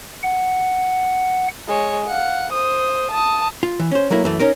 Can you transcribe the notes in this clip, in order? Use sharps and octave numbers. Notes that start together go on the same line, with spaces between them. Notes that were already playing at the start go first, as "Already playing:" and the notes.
F#5
G#3 C#5
F5 F#5
C5 D#6
A5 D#6
F4
E3
C#4 C5
F#3 A3 A#3 E4
F#2 E3 A3
C#4 D#4 A#4